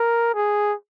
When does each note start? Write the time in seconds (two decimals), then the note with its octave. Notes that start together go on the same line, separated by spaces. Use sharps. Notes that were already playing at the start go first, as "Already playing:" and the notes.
Already playing: A#4
0.34 G#4